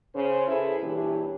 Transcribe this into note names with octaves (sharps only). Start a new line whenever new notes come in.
C#3 C5
E4 G#4 A4 B4
A#2 E3 G3 C#4 D4 G4